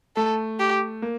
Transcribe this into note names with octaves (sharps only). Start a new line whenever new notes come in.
A3 A4
G4
A#3